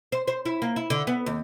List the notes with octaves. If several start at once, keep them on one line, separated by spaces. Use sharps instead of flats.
C5
C5
E4
A#3
E4
D3
B3
D#2